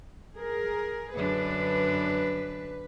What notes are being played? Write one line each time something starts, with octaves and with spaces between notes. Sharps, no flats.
G#4 A#4
F#2 D3 D4 B4